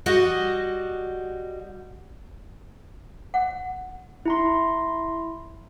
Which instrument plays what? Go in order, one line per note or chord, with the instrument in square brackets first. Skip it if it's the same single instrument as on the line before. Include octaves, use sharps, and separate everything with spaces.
[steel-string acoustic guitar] G3 F#4 D#5 F#5
[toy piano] F#5
[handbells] E4 A#5 C6